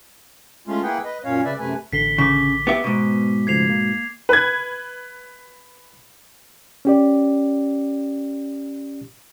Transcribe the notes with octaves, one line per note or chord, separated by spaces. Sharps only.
G#3 A3 C#4 F4
A#3 E4 G#4 B4 F#5 G5
B4 D#5
F#2 A#2 C#4 C#5 F5
C#3 B4 D5 E5
F#2 C3 A3 B4 G#5
A1 D3 B6 C7 G7
C#3 D6 B6
B3 G4 E5
G#2 B2 B3
C#3 F3 A3 G#6 C7 F7
A#3
B4 G#6
C#4 G4 D5